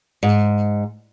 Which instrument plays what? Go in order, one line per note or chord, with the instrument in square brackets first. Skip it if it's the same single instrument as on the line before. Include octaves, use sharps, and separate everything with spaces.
[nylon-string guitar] G#2